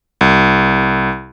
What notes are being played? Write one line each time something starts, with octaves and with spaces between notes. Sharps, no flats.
C2